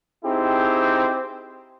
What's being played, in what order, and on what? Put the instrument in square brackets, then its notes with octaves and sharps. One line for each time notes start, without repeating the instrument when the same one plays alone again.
[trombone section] C4 D#4 E4 G4 G#4